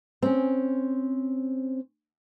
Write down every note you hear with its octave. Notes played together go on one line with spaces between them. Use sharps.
C4 C#4